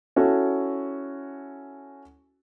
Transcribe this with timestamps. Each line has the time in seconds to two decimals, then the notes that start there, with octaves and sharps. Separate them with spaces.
0.16 C#4 E4 F#4 A4